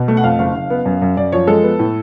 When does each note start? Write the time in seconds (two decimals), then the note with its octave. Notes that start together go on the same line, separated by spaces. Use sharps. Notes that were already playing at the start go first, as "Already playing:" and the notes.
Already playing: B2
0.08 A3
0.17 F#5
0.24 F2 F5
0.39 F#1 F5
0.55 F#1
0.70 B3
0.85 F#2
1.02 F#2
1.17 F#2 D5
1.32 F3 C#5
1.47 G#3 A4
1.63 B3
1.79 A2